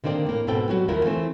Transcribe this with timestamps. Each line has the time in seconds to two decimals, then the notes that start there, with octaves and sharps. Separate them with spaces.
0.04 D3 D#3 A#3 C4 D5
0.26 A2 A#3
0.47 G#2 B2 B3 C4 A4 G5
0.69 F#3 G3 F#4
0.88 D#2 A3 A#3 E4 F4 A#4
1.04 E3 A3 C4